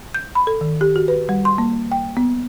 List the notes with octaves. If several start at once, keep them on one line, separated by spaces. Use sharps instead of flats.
G6
B5
A4
D#3
G4
F#4
B4
G3
C6
A#3
G5
B3